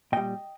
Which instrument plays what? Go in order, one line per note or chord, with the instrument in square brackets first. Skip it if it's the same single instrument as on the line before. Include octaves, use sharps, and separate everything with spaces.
[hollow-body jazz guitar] A#2 G3 D#5 G5